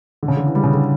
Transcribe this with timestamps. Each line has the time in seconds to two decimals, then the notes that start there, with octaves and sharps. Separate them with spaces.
0.23 D3
0.28 C#3
0.37 D3
0.46 E3
0.55 G3
0.63 C#3
0.74 D3